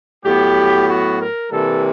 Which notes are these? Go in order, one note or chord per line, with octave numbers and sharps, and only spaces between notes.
A2 F#3 B3 G4
F#4
A#4
C3 E3 G3 A#3 A4